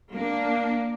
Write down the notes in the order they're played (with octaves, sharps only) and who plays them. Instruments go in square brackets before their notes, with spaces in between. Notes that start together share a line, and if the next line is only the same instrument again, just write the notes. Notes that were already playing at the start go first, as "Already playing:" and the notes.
[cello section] A#3 D4